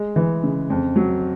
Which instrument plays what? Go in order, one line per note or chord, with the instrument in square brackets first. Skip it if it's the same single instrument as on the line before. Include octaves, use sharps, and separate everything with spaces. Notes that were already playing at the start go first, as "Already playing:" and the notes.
Already playing: [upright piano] G#3
E3
C#3
F2
F#3